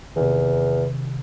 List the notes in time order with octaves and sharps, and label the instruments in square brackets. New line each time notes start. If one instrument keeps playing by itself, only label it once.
[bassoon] E2 [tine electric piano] C3 D#3